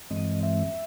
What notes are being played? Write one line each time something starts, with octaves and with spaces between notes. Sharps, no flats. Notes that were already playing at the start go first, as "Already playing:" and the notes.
G2 E3 G#3 C4 D#5
E5